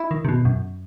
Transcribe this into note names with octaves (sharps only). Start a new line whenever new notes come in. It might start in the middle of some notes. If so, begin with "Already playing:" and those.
Already playing: E4
D#3
C3
B2
F#2